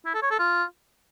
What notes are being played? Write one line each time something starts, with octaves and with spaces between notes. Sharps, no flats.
E4
A4
C#5
A4
F4